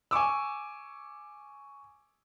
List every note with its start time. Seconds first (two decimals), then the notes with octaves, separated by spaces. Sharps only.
0.11 G#5 C#6 D6 E6